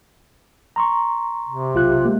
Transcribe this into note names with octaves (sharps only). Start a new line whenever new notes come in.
A#5 C6 C#6
C3
B1 F4 F#6
G#3 A#3